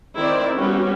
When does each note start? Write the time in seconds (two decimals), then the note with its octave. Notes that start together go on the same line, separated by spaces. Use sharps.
0.16 D#3 C4 E4 C5 D5
0.55 G3 B3 C#4 F#4